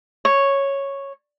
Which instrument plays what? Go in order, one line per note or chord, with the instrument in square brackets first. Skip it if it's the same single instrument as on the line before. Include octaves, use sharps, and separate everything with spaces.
[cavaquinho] C#5